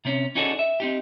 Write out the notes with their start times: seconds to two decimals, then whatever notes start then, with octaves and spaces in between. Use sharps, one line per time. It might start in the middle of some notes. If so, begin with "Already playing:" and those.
0.05 C3 C4 C#4
0.35 C#4 D#4 F#4 G#4 A4 D5
0.59 E5
0.80 C4 D#4 G4